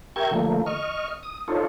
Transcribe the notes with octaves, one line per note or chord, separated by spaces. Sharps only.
G4 A#4 E5 G5 C#6 G#6
D3 F3 A3 A#3
D#5 C#6 F6
D#6
D4 D#4 F4 A4 C5 C#5